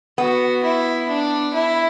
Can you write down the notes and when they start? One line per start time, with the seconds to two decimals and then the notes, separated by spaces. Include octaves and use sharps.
0.18 B3 F#4
0.63 E4
1.09 D4
1.54 E4